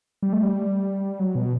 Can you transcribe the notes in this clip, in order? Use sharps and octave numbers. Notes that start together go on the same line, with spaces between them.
G3
A3
G3
F#3
B2